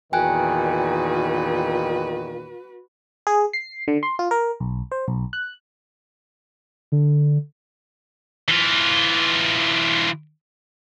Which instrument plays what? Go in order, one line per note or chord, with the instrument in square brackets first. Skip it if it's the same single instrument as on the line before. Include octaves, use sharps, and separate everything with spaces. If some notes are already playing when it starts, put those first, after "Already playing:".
[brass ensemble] E2 A#2 D#3 [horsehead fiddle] F#4 B4 [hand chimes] G5 G#5 F#6
[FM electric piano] G#4
C7
D3
C6
F4
A#4
B1
C5
B1
F#6
[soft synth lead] D3
[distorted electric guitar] E3 F4